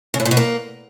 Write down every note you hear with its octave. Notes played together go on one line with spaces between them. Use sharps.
C#3
A2
A#2
B2
A#3